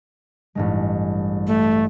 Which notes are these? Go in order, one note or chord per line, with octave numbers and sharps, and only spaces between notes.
A1 G2 G#3
A3